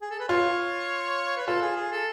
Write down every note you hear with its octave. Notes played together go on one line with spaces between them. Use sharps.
G#4
A4
B4
F4 C#5
B4
F4 A4
G#4
G#4
A4